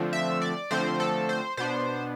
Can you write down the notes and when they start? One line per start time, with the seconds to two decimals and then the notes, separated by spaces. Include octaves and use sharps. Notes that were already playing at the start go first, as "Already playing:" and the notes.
Already playing: D3 F3 A3 C4
0.13 E5
0.42 D5
0.71 D3 F3 A3 C4 C5
1.00 A4
1.29 C5
1.57 B2 B3 D4 C5